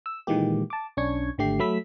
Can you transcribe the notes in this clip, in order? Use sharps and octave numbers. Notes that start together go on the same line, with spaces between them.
E6
A#2 D#3 E3 G#3 A#3 G4
A5 D6
B1 C#4 D4 C#6 G#6
G#1 D3 A3 G4 C7
F#3 A3 B5 E6 B6